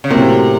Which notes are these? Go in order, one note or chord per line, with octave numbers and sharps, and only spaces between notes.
C#3
A2 C3 F#3 A#3